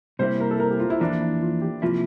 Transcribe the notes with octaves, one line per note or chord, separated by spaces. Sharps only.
C3 G3 A#3 E4 C5
A#4
A4
A#4
G4
F4
E4
F2 E3 A#3 D4
E4
F4
G4
C3 F3 A#3 E4 F4